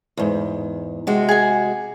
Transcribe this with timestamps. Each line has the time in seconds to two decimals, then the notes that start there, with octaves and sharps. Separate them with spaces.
0.17 E2 G#2
1.07 C3 G#3 F#4
1.29 G#4 G#5